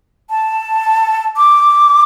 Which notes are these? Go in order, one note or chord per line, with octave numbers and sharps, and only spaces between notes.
A5
D6